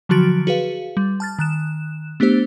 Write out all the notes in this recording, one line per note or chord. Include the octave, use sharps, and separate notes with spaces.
D3 F3 F#3 F#4 A6 D7
F#4 G#4 B4 F5
G3
A5 F6 A6
D#3 F#6 E7
A3 B3 D4 G4 C5